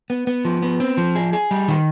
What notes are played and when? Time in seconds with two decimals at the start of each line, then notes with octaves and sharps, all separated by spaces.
0.10 B3
0.27 B3
0.45 F3
0.62 B3
0.80 C4
0.97 F3
1.15 G#4
1.33 G#4
1.51 G3
1.68 D#3